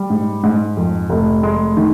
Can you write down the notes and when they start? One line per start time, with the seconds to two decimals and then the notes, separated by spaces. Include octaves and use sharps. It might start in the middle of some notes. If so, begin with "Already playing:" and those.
Already playing: G3
0.10 G#2
0.43 G#2
0.77 F2
1.10 F1
1.43 G#3
1.77 D#3